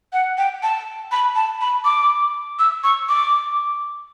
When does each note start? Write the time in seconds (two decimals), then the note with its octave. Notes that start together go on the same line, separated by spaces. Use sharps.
0.13 F#5
0.38 G5
0.63 A5
1.11 B5
1.36 A5
1.61 B5
1.85 D6
2.59 E6
2.84 C#6
3.09 D6